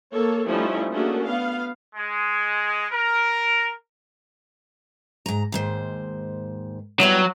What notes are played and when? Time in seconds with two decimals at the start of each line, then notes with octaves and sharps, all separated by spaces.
0.14 A#3 A4 C#5
0.47 F3 G3 A3 C#4 D#4 E4
0.93 A3 A#3 C#4 D4 F#4 G#4
1.23 B3 F5
1.95 G#3
2.91 A#4
5.26 G#2 A#5
5.52 D#2 G#2 C5
7.00 F#3 G3 B3 E4